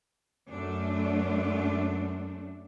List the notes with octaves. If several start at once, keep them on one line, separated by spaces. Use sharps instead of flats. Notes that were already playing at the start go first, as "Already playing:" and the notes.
F#2 A3 D4